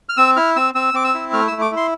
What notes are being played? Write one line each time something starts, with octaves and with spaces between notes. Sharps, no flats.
F6
C4 E6
E4 F6
C4 E6
C4 E6
C4 D6
E6
E4
A3 F6
A3 E6
D6
E4
C6